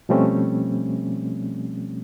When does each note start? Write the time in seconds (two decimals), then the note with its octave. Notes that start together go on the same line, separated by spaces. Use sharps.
0.09 B2 F3 G3 A3 C4 C#4